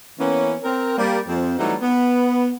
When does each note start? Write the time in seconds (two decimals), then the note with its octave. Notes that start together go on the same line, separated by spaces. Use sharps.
0.19 E3 A#3 B3 C#4
0.63 C4 A#4
0.98 G3 A#3
1.27 F2 F3 C4
1.59 E3 F#3 G3 A3 D#4 F#4
1.82 B3